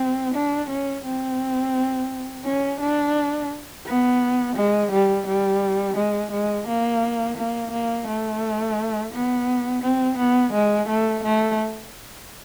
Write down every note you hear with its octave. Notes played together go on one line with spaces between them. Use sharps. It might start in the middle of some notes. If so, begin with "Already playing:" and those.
Already playing: C4
D4
C#4
C4
C#4
D4
B3
G#3
G3
G3
G#3
G#3
A#3
A#3
A#3
A3
B3
C4
B3
G#3
A3
A3